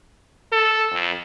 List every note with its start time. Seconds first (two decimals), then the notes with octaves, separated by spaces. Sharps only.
0.52 A4
0.92 F2